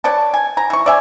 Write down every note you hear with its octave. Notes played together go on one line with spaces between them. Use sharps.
B4 C#5 D5 A5
G#5
A#5
E3 C#6
D5 E5 G#5